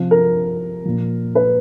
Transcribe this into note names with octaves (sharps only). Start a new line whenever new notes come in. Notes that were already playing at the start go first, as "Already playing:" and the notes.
Already playing: C3 F3
A#4
A#2 F3
B4